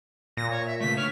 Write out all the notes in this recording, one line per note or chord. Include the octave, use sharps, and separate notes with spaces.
A#2 A#6
C#5
E5
C#3 A3 B6
D3 C#5 F6